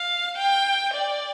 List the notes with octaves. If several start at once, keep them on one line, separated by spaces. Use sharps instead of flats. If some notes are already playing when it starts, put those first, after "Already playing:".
Already playing: F5
G5
D5